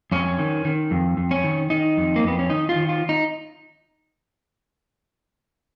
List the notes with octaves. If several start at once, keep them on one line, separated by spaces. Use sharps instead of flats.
F2 C#4
D#3
D#3
F2
F2
C#4
D#3
D#3 D#4
F2
A#3
F2 B3
C#4
D#3 D#4
F4
D#3
F4
D#4